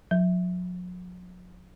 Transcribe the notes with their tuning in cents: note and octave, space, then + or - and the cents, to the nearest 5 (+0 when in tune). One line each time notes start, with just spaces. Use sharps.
F#3 -45